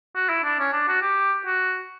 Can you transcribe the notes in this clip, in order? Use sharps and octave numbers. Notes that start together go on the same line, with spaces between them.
F#4
E4
D4
C#4
D4
F#4
G4
F#4